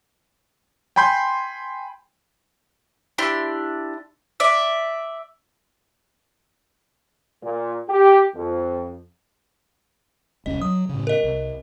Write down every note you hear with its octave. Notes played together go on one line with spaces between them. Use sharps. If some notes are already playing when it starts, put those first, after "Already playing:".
G5 G#5 B5 C6 G6
D4 E4 G4 C6
D5 E5
A#2
G4
F2
E1 C2 C#4 D#5
F#3 D#6
A2 C#3
A#4 D#5
C2